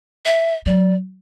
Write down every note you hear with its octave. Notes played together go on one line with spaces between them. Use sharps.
E5
F#3 D5